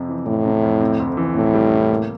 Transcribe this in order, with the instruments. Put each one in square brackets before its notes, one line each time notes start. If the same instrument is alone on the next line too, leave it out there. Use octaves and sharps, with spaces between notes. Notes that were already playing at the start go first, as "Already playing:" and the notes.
Already playing: [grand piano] F2 C3
E3
[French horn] A2 [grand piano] C3
[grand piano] C3
F2
C3
D2
E3
[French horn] A2 [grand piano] C3
[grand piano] G3
C3
A#3